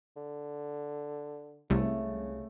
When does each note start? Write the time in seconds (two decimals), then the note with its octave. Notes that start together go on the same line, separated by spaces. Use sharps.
0.16 D3
1.70 C2 C#3 A3